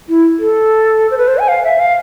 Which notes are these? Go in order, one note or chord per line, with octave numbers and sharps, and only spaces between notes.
E4
A4
C5
B4
C5
G#5
F5
E5
F5